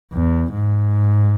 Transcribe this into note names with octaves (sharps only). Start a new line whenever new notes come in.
E2
G#2